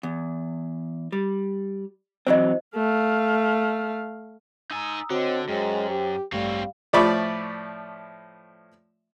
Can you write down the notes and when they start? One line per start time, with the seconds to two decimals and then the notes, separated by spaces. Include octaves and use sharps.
0.03 E2
1.12 G3
2.27 E3 F#3 C4 C5 D#5
2.76 A3 F5
4.71 D#4 G#5 A#5 D#6 E6
5.10 D3 C4 F#4 C#5 D#5
5.49 F#2 G#3 C5 C#5 G5
5.90 G4
6.32 A1 G2 G3 A3 C4 C#5 F5
6.93 A2 F3 D5 E5 B5 C#6